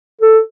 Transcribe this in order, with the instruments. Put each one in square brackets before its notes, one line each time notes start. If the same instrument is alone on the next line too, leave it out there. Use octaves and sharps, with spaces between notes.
[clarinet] A4